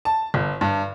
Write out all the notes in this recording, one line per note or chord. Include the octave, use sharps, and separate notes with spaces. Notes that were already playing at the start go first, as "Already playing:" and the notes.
A5
G1
G2